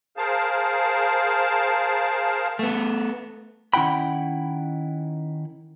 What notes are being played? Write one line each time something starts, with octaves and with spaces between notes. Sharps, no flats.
G#4 A#4 C5 F5 A5
A3 B3
D#3 C#4 E4 F#5 G5 B5